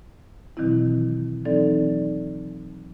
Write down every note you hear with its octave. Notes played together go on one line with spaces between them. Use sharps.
B2 D#3 E3 F#3 C4 E4
E3 F#3 C4 D#4 A4 D5